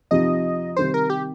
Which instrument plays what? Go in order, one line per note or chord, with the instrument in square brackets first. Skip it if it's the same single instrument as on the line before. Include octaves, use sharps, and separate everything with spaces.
[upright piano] F2 C3 F3 D#4 G4 [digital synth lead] D#5
[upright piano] C3 D#3 G3 [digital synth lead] C5
[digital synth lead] A#4
G4